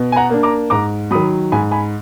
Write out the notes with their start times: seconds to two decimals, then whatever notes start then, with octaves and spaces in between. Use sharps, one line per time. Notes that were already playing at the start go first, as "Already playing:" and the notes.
Already playing: B2
0.12 G#5
0.16 F#5 A#5
0.30 A#3 D4
0.43 A#5 D6
0.70 G#2 A#5 D6
1.11 D#3 F#3 B5 D#6
1.52 G#2 G#5 B5
1.72 G#5 B5